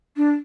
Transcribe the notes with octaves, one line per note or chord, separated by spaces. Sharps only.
D4